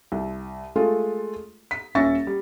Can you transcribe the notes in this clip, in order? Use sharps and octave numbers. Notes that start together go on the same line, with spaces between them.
C2
G#3 A3 F4 A4
B6
D#1 C#4 E5 C#6 A6 A#6
G3